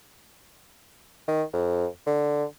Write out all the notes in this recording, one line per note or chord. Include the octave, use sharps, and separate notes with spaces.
D#3
F2
D3